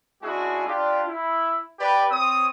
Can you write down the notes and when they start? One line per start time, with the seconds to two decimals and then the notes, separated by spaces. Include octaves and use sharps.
0.23 G#3 C#4 D4 E4 F#4 G#4
0.67 D4 F4 G4
1.08 E4
1.79 G4 B4 D5
2.12 C4 C#5 D#6